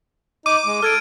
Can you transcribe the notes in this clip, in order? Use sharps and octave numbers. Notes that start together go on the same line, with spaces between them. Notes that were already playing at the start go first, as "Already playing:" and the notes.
D#4 D6 D#7
G#3
A4 F6 G#6 D7